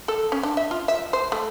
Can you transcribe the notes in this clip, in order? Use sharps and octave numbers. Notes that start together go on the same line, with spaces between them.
A4
C#4
D4
E5
F4
E5
C5
A3